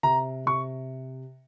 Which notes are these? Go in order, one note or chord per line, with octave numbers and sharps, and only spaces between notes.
C3 A#5
C3 C#6